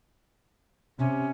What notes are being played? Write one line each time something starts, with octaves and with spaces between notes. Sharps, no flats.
C3 C#4